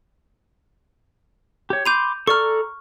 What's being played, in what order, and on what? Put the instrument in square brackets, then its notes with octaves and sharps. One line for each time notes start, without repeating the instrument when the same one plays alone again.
[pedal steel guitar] G4 C#5
[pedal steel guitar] B5 C6 D6 [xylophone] G6 D#7 F7
[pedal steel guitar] A4 D5 A#5 [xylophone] C#6 F6